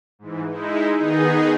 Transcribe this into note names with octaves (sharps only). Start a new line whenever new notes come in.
G#2 E3
G#3 D#4 E4
D#3 B3 D#4 G#4